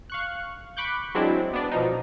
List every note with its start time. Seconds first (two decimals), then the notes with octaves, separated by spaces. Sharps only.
0.10 F5 C#6 F#6
0.77 B5 C#6 D6 F#6 G6
1.15 F#3 G#3 C4 D4 E4
1.53 B3 D4
1.71 B2 F3 D#4